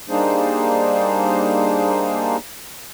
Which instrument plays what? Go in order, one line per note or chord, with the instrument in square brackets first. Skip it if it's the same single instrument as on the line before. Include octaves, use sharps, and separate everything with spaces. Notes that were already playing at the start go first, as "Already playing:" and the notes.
[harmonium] G3 A#3 D4 D#4 G#4 C5